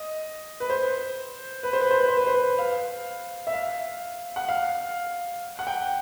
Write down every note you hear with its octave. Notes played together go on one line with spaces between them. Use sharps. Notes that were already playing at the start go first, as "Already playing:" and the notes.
Already playing: D#5
B4
C5
B4
C5
B4
C5
B4
C5
B4
C5
B4
F5
E5
F5
F#5
F5
F#5
G5